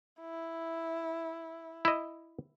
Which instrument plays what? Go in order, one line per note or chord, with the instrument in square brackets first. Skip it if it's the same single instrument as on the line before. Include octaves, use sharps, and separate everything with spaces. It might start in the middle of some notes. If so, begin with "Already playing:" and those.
[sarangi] E4
[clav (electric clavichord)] E4 D#5